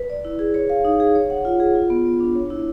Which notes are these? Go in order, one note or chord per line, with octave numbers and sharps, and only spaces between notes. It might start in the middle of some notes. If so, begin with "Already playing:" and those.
Already playing: B4
D5
E4
G#4
C#5
F5
D#4
G#4
C#5
F#5
F4
G#4
F4
B3
B3
D4
C#5
E4